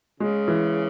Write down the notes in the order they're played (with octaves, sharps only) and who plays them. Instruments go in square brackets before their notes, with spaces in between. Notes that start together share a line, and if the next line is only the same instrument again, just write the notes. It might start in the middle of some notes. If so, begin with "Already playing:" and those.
[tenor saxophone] C#3 [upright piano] G#3
[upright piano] E3